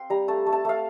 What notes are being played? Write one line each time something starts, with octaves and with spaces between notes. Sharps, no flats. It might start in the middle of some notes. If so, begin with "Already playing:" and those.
Already playing: C4 F5 G5 C6
G3 A#5
A3 A5
A3
A5
A3 F5